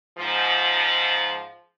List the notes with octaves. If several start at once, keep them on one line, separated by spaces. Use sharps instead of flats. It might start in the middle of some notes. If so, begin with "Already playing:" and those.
G#2 F3